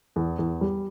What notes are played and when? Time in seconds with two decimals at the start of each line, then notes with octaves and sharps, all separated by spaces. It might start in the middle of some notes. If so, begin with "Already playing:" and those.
0.16 E2
0.39 E2
0.61 G3